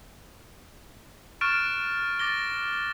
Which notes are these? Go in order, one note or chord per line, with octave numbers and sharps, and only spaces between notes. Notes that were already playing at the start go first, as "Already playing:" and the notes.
C#6 F6 F#6 A6 D7 E7
D6 A6 A#6 G7